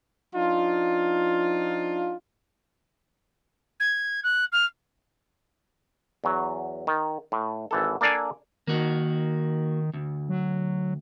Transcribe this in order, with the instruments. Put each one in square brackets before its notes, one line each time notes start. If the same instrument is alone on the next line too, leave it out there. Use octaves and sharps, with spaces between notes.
[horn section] F3 D4 D#4 F4
[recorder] G#6
F#6
F6
[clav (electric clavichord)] E2 F#3
D#3
A2
G#1 E3 A4
A#3 D4 A4 D5 F5 G#5
[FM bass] D#3 [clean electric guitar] A#3 F#4
[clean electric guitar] D2
[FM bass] F#3